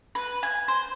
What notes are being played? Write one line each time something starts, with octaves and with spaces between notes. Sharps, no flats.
B4
G#5
C5